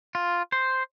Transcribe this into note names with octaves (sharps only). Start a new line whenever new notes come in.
F4
C5